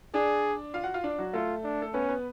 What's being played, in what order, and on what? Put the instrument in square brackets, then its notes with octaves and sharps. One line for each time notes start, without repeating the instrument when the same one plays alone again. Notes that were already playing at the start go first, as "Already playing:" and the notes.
[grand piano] D4 D5 [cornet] G#4
[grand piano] F4 F5
F#4 F#5
F4 F5
D4 D5
F#3 F#4
[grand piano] A3 A4 [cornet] F4
[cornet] D4
[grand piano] A4
[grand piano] B3 B4 [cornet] C#4
[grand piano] B3 B4